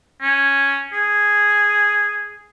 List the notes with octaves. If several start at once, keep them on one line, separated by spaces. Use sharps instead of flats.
C#4
G#4